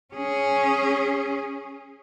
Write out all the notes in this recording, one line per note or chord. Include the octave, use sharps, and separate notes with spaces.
C#4 G#4